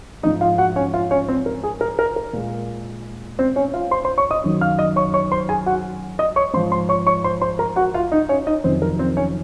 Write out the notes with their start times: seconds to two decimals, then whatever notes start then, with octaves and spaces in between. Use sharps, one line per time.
0.23 G#2 F3 G#3 D#4 D#5
0.41 F4 F5
0.58 F#4 F#5
0.76 C#4 C#5
0.94 F4 F5
1.11 C#4 C#5
1.28 C4 C5
1.46 A#4
1.64 G#4
1.81 A#4
1.99 A#4
2.16 A#4
2.33 A#2 G#3
3.39 C4 C5
3.56 C#4 C#5
3.74 F4 F5
3.91 C5 C6
4.05 C5 C6
4.17 C#5 C#6
4.31 D#5 D#6
4.44 F#2 D#3 F#3
4.61 F5 F6
4.79 D#5 D#6
4.96 C#5 C#6
5.14 C#5 C#6
5.32 C5 C6
5.49 G#4 G#5
5.66 F#4 F#5
6.19 D#5 D#6
6.36 C#5 C#6
6.54 G#2 F3 G#3 C5 C6
6.72 C5 C6
6.89 C#5 C#6
7.07 C#5 C#6
7.24 C5 C6
7.42 C5 C6
7.59 A#4 A#5
7.76 F#4 F#5
7.94 F4 F5
8.12 D#4 D#5
8.29 C#4 C#5
8.47 D#4 D#5
8.64 F2 C3 D#3 F#3 C4 C5
8.82 A#4
8.99 C4 C5
9.17 C#4 C#5